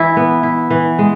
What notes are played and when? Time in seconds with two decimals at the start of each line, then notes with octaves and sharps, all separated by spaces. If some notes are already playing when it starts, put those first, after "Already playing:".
Already playing: E3 E4
0.17 B3
0.43 E4
0.70 E3
0.99 G#3